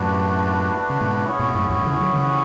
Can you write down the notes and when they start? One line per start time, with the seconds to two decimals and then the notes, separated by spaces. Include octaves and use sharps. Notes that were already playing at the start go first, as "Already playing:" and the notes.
Already playing: F#2 A2 A3 D4 F#4 B4
0.90 C#3
1.01 G#2 B2
1.24 C#4 E4 G#4 C#5 F#5
1.39 G#2 B2
1.54 F#2 A2
1.70 E2 G#2
1.85 C#3 E3
2.00 D3 F#3
2.15 C#3 E3